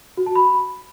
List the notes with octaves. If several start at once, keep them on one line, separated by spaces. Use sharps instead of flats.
F#4
A5
B5